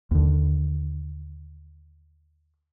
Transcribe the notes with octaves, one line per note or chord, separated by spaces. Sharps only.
D#2 D3